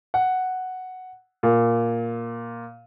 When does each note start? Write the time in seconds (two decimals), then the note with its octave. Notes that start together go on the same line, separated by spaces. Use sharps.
0.14 F#5
1.43 A#2